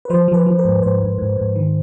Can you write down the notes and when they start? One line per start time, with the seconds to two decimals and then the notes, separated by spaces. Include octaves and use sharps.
0.05 B4
0.10 F3 C5
0.28 F3
0.34 B4
0.46 F3
0.59 A#4
0.65 G#2
0.82 G#2 C5
1.00 G#2
1.18 G#2
1.37 G#2
1.56 D#3